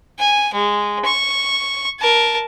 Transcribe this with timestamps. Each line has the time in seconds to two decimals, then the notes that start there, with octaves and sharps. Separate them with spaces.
0.19 G#5
0.54 G#3
1.05 C#6
2.00 A#4 A5